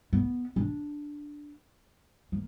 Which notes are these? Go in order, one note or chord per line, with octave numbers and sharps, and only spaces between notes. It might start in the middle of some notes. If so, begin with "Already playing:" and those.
B3
D4
A#3